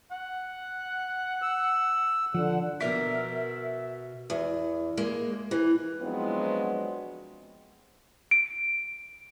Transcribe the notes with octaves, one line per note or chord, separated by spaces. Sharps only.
F#5
E6
D3 F3 F#5
B2 A#4 E5 A#5 D6 B6
E2
G#3 A#3
E3
F3 F#3 G#3 B3 C4 D4
D7